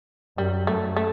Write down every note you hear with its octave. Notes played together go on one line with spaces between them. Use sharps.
F#2 G3
F#2 A3
A3